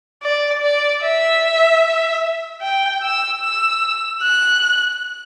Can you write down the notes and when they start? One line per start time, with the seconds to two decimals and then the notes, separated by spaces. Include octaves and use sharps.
0.23 D5
0.62 D5
1.02 E5
2.62 G5
3.02 E6
3.42 E6
4.21 F#6